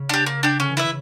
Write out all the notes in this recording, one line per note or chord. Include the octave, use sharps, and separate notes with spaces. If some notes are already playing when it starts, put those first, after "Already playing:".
Already playing: C#3
D4 G4
A#3
D4 G4
D3 C#4
E3
E4 B4 E5
C#3